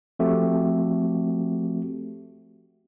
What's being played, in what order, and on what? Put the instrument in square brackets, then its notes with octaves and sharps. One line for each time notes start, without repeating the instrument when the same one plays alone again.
[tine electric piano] F3 A3 C4 F#4 G4